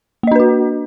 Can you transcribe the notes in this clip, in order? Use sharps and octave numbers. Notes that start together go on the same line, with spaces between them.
A#3 D4 F#4 B4 D#5